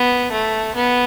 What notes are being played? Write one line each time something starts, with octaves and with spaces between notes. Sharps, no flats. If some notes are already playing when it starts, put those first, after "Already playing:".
Already playing: B3
A3
B3